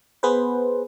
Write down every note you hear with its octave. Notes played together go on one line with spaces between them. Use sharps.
B3 G#4 B4 C5